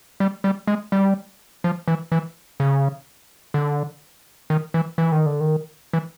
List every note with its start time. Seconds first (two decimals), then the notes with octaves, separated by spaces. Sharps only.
0.20 G3
0.44 G3
0.67 G#3
0.92 G3
1.64 F3
1.88 E3
2.12 E3
2.60 C#3
3.54 D3
4.50 D#3
4.74 E3
4.98 E3
5.12 D#3
5.26 D3
5.40 D#3
5.93 E3